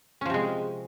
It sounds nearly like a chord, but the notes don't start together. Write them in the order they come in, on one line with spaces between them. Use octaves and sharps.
C#4 F3 C3 G#3